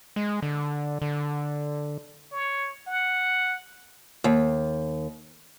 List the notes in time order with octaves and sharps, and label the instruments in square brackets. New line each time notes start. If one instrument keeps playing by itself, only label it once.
[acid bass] G#3
D3
D3
[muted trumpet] C#5
F#5
[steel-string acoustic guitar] D#2